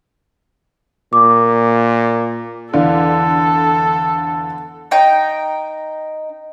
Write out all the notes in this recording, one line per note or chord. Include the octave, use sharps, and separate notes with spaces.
A#2 D6
E2 D3 A4 D5 F5
D#4 G5